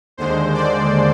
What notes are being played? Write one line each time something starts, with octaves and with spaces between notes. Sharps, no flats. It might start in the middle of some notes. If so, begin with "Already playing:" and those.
D#2 D3 G#3 C5
D5